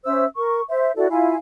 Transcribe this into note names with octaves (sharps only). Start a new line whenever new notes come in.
C#4 C5 E5 E6
A#4 C#6
C5 E5
E4 F#4 A4 D5
E4 F4 F5 G#5